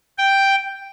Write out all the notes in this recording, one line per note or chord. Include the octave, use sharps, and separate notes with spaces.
G5